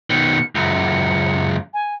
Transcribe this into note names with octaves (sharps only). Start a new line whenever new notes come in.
B2 D#3 C#7
C#2 F#2 C#7
G#5